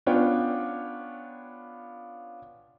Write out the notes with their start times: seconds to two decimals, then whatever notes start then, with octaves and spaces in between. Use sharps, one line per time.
0.06 B3 C#4 D4 F4 C#5 G5